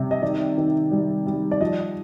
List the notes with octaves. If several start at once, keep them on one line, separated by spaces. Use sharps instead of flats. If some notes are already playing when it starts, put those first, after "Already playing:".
Already playing: C3 G3
D#5
D#3 D5
D#3
G3
G3
D5
F3 D#5